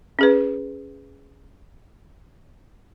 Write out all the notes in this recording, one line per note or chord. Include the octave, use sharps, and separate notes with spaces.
C#4 G#4 B4